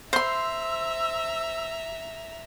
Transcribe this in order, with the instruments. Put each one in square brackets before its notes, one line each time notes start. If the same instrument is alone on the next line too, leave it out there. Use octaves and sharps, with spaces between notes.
[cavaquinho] C5 C6 [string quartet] E5 A#5 [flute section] E6